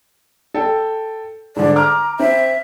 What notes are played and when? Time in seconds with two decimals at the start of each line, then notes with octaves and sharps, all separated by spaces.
0.54 A4 G5
1.56 G#2 D3 D5
1.76 A#5 D6 F6
2.19 C4 E5